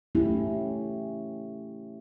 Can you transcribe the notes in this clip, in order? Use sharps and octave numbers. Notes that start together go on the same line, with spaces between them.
A3 C#4 E4 G4